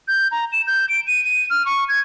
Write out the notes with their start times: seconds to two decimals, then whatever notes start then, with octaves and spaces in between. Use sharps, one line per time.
0.08 G6
0.32 A#5
0.52 E7
0.67 G6
0.89 D7
1.07 D#7
1.25 D#7
1.50 F6
1.66 C#6
1.89 G#6